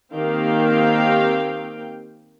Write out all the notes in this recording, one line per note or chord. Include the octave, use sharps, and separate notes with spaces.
D#3 A#3 C4 G4 F5 G5